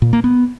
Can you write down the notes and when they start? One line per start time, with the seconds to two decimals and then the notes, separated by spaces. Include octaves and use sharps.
0.02 A#2
0.13 A#3
0.24 B3